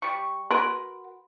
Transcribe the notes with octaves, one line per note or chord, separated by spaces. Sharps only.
G3 C#6
F#4 A#4 B4 C6